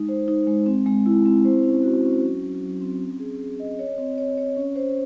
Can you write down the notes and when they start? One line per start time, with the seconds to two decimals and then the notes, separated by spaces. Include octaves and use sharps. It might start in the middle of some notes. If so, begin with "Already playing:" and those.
Already playing: G#3 D#4
0.09 C5
0.28 D#4
0.47 G#3
0.66 C4
0.86 G#3
1.06 E4
1.26 C4
1.45 C5
1.64 C#4
1.83 F#4
2.03 C#4
2.23 F#3
2.42 F#3
2.61 F#3
2.81 C4
3.00 C#4
3.19 G#4
3.40 G#4
3.60 D#5
3.79 C#5
3.98 C4
4.18 C#5
4.38 C#5
4.57 C#4
4.76 C5